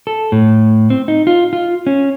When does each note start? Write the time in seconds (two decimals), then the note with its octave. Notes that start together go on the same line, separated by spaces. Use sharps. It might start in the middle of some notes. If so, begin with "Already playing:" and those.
0.07 A4
0.32 A2
0.90 C4
1.08 D#4
1.27 F4
1.53 F4
1.87 C#4